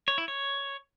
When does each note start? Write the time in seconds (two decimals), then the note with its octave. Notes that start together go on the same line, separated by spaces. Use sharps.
0.08 C#5
0.18 E4
0.28 C#5